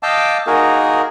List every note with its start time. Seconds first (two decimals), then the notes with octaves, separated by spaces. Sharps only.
0.03 D#5 F5 G5 A5 D6 E6
0.47 A#3 D#4 F#4 G#4 A#4